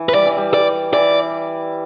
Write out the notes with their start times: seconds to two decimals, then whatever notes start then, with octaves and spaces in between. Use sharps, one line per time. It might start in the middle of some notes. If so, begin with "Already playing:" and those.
Already playing: E3
0.09 B4
0.14 G3 D5
0.26 E3
0.37 G3
0.54 D5
0.93 E3 D5